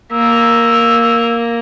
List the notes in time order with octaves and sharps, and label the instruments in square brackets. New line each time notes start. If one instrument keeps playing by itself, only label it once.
[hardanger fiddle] A#3 [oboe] E6